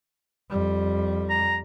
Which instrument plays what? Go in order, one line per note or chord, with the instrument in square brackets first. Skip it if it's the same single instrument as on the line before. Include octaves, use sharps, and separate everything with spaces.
[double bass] F2 G3
[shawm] A#5